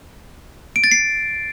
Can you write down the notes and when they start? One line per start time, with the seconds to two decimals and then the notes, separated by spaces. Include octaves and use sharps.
0.76 D7
0.84 A6
0.91 C7